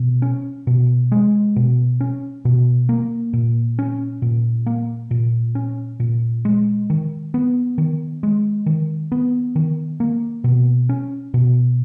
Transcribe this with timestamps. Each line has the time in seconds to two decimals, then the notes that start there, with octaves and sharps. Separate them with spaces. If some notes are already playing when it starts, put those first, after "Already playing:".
Already playing: B2
0.22 C#4
0.67 B2
1.12 G#3
1.56 B2
2.01 C#4
2.45 B2
2.89 A#3
3.33 A#2
3.79 C#4
4.22 A#2
4.66 A#3
5.11 A#2
5.55 C#4
6.00 A#2
6.45 G#3
6.90 D#3
7.34 B3
7.78 D#3
8.23 G#3
8.66 D#3
9.12 B3
9.56 D#3
10.00 A#3
10.44 B2
10.89 C#4
11.34 B2